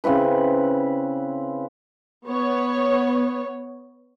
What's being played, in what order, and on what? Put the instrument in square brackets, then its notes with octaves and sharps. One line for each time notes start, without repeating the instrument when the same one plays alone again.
[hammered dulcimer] C#3 C4 E4 B4
[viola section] B3 C#5